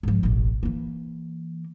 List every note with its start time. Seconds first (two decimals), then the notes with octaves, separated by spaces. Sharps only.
0.03 G#2 F3
0.23 E1 A1
0.63 E3 A#3